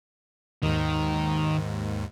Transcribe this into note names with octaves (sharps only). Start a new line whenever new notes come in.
D#2 G#2 D#3